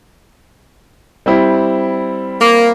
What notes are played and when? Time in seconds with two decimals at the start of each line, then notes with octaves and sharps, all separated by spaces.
1.26 G3 C4 E4
2.38 A#3